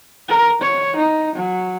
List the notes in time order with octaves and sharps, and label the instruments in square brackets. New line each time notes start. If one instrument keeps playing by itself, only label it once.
[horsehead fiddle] A#4
C#5
D#4
F#3